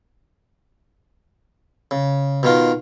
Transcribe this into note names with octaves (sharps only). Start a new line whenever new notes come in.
C#3
B2 D#3 F4